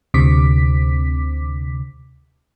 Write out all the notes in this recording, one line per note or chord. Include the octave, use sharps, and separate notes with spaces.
D2 C3 D6 B6